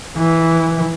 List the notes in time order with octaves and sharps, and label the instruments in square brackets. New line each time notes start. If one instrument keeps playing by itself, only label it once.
[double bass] E3